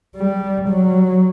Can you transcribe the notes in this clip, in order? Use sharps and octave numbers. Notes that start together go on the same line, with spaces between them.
G3
F#3